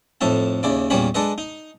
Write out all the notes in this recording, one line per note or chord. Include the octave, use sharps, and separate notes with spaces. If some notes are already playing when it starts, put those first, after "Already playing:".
F2 A2 D#4 E5 A5
D#2 C#3 E4 D5
E2 A#2 G3 C#4 C#5 B5
G#3 D4 A4 B4 D#5
D#4